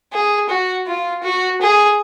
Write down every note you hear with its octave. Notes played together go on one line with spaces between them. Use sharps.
G#4
F#4
F4
F#4
G#4